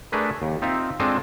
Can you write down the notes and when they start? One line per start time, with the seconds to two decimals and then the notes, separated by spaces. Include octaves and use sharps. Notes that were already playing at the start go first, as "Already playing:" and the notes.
0.12 A3 D4 G#4 A#4 B4
0.42 D#2
0.62 C4 D#4 F4 E5 F5
1.00 G#3 C4 D4 F4 A4 D#5